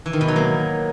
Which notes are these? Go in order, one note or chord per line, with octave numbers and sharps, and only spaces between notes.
E3
D#3
B2
F#3
A#3